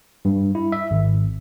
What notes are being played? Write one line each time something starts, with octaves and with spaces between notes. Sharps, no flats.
G2
E4
E5
G#1